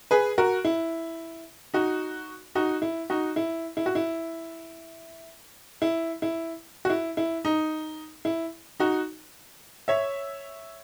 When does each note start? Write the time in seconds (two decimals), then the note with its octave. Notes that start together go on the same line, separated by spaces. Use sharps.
0.11 G#4 B4
0.38 F#4 A#4
0.65 E4
1.74 D#4 F#4
2.55 D#4 F#4
2.82 E4
3.10 D#4 F#4
3.36 E4
3.77 E4
3.86 F#4
3.95 E4
5.82 E4
6.22 E4
6.85 F#4
6.90 E4
7.17 E4
7.45 D#4
8.25 E4
8.80 D#4 F#4
9.88 C#5 E5